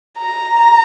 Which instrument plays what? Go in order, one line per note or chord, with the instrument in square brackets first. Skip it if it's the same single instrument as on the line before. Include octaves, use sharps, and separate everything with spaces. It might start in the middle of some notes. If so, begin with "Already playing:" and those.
[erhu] A#5